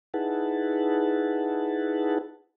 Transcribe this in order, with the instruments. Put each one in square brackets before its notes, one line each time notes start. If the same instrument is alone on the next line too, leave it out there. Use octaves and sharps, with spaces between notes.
[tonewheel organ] D#4 E4 G#4 B4 F#5 A5